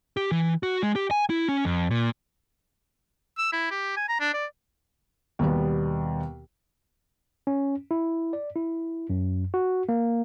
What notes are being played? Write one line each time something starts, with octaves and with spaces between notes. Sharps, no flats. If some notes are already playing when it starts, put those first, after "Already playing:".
G4
E3
F#4
G#3
G4
G#5
E4
C#4
F2
A#2
E6
E4
G4
G#5
A#5
D4
D5
D#2 B2 G3 B3
C#4
E4
D5
E4
F#2
F#4
A#3